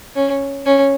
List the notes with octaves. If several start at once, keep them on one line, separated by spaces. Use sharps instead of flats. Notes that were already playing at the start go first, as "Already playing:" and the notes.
C#4
C#4